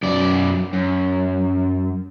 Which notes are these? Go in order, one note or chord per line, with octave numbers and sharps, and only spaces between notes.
F#2 D5
F#2